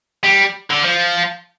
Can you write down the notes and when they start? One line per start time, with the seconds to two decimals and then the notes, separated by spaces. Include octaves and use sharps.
0.23 G3
0.71 D3
0.84 F3